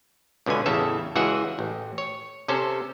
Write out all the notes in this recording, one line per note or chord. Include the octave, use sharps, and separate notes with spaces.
C#2 B2 D3 B3 G#5
A1 E2 C#3 A4 E5
C#2 E3 F#4 G#4 E5 F#5
A1
C#5
C3 C#4 A4 C5